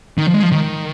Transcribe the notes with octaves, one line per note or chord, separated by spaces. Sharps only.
D#3
F3
G#3
F3
D#3